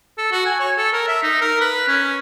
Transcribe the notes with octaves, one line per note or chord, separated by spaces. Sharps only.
A4
F#4
G#5
C#5
A4
A#4
E5
D#4
A#4
B4
C#4